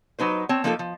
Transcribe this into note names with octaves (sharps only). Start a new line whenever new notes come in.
F#3 D#4 B4 C5
C4 C#5 A5
F3 A#3 D#4 F4 G4 A4
F3